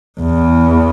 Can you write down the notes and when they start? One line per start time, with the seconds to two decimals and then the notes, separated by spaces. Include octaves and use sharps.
0.20 E2